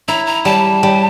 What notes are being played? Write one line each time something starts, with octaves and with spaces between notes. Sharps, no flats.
E4 A#5
A#5
G3 A5
G3